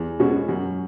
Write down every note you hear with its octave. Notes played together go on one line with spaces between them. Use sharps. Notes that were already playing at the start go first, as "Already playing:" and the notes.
Already playing: E2
B2 G#3 C#4 F#4
F#2